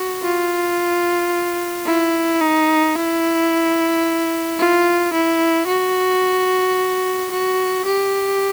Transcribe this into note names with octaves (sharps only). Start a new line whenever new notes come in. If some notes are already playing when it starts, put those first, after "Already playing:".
Already playing: F#4
F4
E4
D#4
E4
F4
E4
F#4
F#4
G4